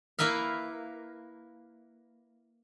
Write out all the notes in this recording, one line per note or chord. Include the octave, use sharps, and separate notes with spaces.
A#3 E4 B4 E5 F5